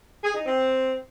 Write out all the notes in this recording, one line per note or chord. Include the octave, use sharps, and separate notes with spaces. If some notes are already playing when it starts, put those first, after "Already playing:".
G#4
D#4
C4